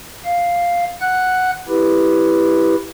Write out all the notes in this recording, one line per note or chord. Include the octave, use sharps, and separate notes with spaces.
F5
F#5 F#6
E4 G4 B4